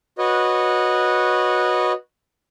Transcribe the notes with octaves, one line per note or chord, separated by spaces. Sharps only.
F#4 B4 C#5 D#5